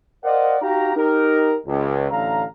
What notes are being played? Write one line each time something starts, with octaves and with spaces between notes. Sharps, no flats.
A#4 C5 D5 D#5 F5 F#5
D#4 F#4 G4 F5 A#5
D#4 G4 A#4
C#2
A1 A2 D3 F5 A#5